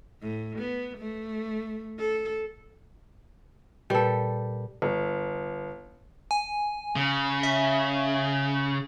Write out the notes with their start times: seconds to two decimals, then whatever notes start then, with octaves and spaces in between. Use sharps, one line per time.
0.22 A2
0.59 B3
0.98 A3
1.99 A4
3.90 A#2 G3 A4 B4
4.82 G1
6.31 G#5
6.96 C#3
7.43 E5